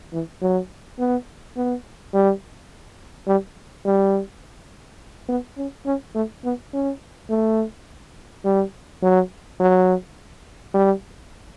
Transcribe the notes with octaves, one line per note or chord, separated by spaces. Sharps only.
E3
F#3
B3
B3
G3
G3
G3
B3
C#4
C#4
A3
B3
C#4
A3
G3
F#3
F#3
G3